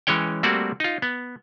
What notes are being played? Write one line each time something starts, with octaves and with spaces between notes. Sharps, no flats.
E3 G#3 C#4 C#5 G5
G3 A3 A#3 C4 F#4 D5
D#4 F4
B3